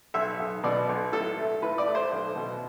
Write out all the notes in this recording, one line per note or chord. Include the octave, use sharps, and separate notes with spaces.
B1 E5
B1
B2 D5
B1
A2 A4
A3
A2 B4
D5
A3
C5
B1
B2